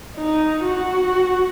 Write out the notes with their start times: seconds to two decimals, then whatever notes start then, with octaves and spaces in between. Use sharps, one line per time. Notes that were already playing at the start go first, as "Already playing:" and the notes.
0.17 D#4
0.64 F#4